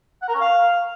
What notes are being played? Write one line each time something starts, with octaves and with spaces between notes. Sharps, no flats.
F#5
A#4
C#4
F5